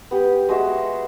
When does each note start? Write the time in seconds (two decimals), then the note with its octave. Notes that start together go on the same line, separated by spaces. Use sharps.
0.11 B3 G4
0.49 G#3 F#4 E5